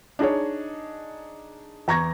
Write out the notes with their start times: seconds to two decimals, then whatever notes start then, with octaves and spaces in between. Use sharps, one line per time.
0.19 D4 D#4 G#4 C#5
1.88 E2 A#5 C#6 G#6 A#6